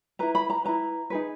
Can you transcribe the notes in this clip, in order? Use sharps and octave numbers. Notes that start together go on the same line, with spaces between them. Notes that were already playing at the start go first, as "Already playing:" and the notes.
E4 B4 A#5
B5
A#5
E4 B4 A#5
D#4 G#4 B4